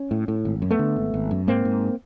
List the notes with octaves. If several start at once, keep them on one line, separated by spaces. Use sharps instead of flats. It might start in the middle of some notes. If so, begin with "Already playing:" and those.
Already playing: C#4
A2
A2
G#1
F#2
A3 B3
D3
G#1
G#1
F#2
G#2 A#3 C4
G#2